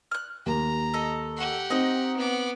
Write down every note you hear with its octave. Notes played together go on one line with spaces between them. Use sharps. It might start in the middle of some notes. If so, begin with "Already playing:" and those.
F6 F#6
D#2 A#5
A4 D#5
G4 F#5
C4 D#4 D#5
B3 D6